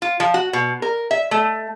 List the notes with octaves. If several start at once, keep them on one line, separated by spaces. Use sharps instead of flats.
F4
F3
F#4
B2
A#4
E5
A3